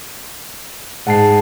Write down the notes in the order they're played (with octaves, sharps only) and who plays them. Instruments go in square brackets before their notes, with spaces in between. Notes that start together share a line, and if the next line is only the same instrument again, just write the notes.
[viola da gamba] G#2 [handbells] F#5 A5 C7